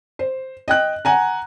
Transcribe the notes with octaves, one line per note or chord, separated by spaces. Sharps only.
C5
D#5 G5 F#6
F#5 G#5 A#5